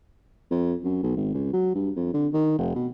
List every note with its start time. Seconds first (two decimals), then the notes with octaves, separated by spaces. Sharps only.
0.51 F2
0.84 F#2
1.03 B1
1.16 G#1
1.34 C#2
1.53 F#3
1.75 G2
1.96 F2
2.13 D3
2.33 D#3
2.58 F1
2.75 B2